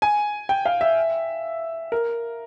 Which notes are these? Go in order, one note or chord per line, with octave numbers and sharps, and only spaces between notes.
G#5
G5
F5
E5
A#4